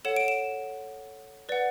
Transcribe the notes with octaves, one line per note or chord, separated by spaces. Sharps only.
A4 C#5 F#5 E7
D7
E7
B4 D5 F#5